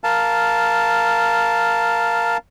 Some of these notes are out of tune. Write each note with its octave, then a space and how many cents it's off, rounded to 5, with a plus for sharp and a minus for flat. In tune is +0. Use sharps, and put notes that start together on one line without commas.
A#4 +0 F5 -5 A5 -5